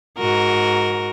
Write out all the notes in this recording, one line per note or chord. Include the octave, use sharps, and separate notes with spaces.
G#2 F#4 A#4